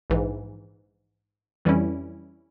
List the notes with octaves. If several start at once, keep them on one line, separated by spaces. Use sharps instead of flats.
A#1 G#2 E3
F2 E3 G3 C#4 E4